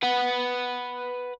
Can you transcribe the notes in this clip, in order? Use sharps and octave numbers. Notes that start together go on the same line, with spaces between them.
B4 F#5